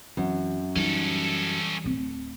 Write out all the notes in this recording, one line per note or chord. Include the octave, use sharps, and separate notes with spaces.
F#2 E3 F#3 C4
E3 G3 C#4 D#4 A4
D1 C4